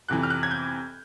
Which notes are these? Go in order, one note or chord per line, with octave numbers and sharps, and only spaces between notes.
F2 C3 E3 F#6
F6
F#6
G#6
G6